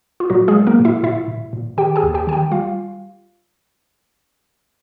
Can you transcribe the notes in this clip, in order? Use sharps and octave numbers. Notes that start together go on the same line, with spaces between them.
F4
A#2 F#3 F#4
G#3 G#4
F#3
A#3 A#4
A#2
E4 E5
A#2 E4 E5
A#2
A#2
D#3 G4 G5
G#4 G#5
D#2
G4 G5
D#3 G#5
G4 G5
G3 F4 F5